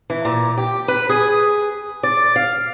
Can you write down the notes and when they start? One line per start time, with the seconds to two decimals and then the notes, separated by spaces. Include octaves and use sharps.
0.10 E3
0.25 A#2
0.58 G4
0.88 B4
1.09 G#4
2.03 D5
2.36 F5